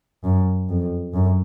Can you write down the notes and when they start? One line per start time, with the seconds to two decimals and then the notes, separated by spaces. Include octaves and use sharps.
0.24 F#2
0.69 F2
1.14 F#2